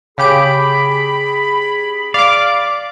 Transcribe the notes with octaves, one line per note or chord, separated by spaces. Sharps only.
C#3 G4 G#4 B5 D7
D5 F5 D6